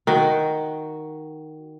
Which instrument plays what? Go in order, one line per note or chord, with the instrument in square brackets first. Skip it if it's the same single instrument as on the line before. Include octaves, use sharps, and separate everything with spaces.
[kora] D#3 F#4